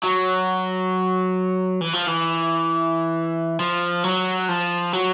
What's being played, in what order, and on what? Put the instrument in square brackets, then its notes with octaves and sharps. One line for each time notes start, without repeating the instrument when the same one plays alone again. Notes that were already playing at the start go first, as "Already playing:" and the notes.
[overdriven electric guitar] F#3
E3
F3
E3
F3
F#3
F3
F#3